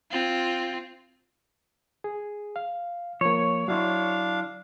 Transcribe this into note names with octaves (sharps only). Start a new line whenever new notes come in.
C4 F4
G#4
F5
F3 A#3 C#5
F#3 D4 E4 F5 C6